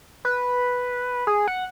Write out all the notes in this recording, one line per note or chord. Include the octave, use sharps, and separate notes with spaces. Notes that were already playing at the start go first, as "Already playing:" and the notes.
B4
G#4
F#5